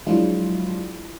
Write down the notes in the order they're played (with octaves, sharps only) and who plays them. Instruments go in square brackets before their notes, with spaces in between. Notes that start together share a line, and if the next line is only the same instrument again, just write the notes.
[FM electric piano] F3 F#3 G#3 D4 E4 F4